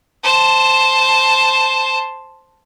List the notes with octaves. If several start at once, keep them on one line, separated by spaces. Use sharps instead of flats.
C5 A5